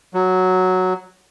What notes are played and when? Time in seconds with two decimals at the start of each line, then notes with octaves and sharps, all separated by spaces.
0.14 F#3